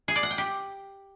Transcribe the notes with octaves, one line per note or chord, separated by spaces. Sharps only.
G#4
D5
F#5
G5
G4